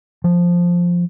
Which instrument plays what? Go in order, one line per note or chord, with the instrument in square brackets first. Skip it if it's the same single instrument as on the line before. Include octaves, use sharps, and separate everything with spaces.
[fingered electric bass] F3